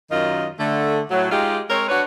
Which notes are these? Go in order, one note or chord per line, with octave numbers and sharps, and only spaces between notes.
F#2 D#3 F4 D#5
D3 A3
A2 F#3
G#3 D#4 F4 G4
G#3 C4 A#4 C#5
D4 F#4 B4 C#5